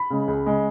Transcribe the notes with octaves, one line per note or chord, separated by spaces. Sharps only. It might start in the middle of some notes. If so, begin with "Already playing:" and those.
Already playing: B5
C#3 G#3
C#2
C#3 G#3